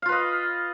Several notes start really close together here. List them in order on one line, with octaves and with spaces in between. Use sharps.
F5 F4 B4 D#5